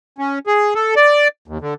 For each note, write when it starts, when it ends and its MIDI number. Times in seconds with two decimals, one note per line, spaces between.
0.18 0.39 61
0.47 0.74 68
0.75 0.95 69
0.96 1.28 74
1.48 1.58 39
1.61 1.74 50